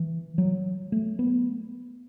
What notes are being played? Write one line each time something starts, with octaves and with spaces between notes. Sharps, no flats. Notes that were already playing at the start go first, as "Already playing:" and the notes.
Already playing: E3
F#3
A3
B3